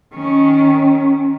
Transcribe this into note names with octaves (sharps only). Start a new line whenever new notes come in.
D#3 C#4